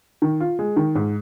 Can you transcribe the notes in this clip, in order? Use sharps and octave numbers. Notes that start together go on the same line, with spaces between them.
D#3
F4
G#3
D#3
G#2